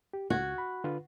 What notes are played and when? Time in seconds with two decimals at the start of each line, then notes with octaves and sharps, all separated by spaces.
0.13 G4
0.30 C#2 F#4 G#6
0.58 B5
0.84 D3 F4 B4